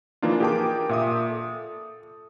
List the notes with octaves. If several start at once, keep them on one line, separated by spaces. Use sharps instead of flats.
E3 F3 A#3 D4 D#4 F4
G4 G#4 A#4 G5 A5 D6
A#2 E5 D#6
A4